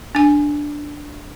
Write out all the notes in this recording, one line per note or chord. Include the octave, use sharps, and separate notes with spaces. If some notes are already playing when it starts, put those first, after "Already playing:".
D4 G#5